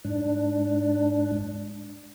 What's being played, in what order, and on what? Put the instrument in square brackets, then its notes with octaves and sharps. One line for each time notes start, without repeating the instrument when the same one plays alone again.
[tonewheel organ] G#2 D4